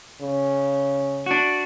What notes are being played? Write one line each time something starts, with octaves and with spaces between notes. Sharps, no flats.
C#3
D4 F#4